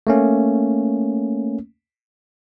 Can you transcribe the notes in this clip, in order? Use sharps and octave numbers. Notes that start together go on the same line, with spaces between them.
A3 A#3 C#4